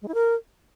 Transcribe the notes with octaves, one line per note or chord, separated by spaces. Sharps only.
G#3
E4
A#4